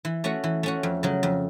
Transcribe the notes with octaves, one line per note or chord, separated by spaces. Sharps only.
E3
A3 C#4 F#4
E3
A3 C#4 F#4
F2
C#3 F#3
F2